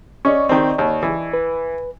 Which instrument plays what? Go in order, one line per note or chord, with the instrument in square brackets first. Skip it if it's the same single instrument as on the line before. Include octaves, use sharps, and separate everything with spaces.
[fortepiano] C#4 [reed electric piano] D5 D#5 C#6
[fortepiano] D#3 C4
D#2
E3
[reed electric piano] B4